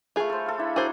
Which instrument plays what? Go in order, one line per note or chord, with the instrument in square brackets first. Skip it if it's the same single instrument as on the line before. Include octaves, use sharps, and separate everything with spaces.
[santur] A3 B4 [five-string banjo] F4 G#4
[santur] A4 C5
A4 F5
D4 E4 B5
[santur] F#3 D4 E4 [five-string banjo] G#4 C5